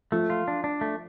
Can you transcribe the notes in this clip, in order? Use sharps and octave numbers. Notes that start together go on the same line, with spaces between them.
F3 A3
F4
D4
D4
A3